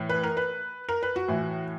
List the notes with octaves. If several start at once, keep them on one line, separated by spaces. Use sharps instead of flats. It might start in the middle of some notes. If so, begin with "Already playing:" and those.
Already playing: A2 E3
B4
A#4
B4
A#4
B4
F#4
A2 E3